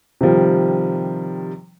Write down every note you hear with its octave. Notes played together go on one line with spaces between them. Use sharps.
C3 D#3 F3 G3